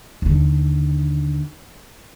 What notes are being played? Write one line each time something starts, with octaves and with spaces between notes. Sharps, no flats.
D#2 D3